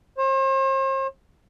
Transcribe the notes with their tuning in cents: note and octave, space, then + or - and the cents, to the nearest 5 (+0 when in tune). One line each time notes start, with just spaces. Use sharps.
C5 +40